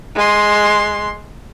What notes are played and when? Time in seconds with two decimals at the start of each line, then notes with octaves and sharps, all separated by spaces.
0.15 G#3 C6